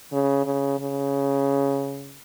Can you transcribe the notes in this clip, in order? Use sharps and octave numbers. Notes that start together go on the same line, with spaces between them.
C#3
C#3
C#3